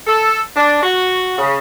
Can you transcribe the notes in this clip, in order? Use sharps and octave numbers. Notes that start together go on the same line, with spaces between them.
A4
D4
F#4
C#3